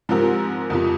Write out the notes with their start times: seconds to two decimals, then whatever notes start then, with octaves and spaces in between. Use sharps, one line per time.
0.09 G#2 F3 C4 G4 A#4
0.70 F2 C3 F3